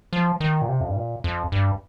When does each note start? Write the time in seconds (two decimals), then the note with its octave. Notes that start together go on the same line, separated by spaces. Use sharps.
0.13 F3
0.40 D#3
0.62 A#2
0.69 C3
0.81 F2
0.88 G2
0.96 A#2
1.24 F2
1.52 G2